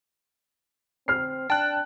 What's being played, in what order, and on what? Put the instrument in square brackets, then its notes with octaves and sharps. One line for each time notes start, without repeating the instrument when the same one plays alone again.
[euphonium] C4 [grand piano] F6 C7
[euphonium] D4 [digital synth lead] G5 [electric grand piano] A5 F#6